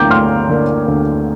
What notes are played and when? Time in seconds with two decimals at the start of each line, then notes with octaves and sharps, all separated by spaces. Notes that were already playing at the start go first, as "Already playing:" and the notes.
Already playing: D2 D3 A#3 D4 G5 A#5 D6 G6
0.10 D2 C6 F6
0.49 D3 A#3 D4
0.88 D2